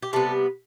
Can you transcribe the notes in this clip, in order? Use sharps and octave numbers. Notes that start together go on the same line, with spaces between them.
G4
C3 G3 B3 A4